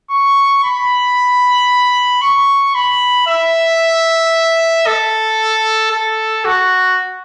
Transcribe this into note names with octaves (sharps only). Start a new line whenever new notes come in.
C#6
B5
C#6
B5
E5
A4
A4
F#4